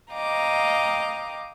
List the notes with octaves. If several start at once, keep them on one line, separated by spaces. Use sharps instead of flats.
D#5 F5 G5 A#5 D6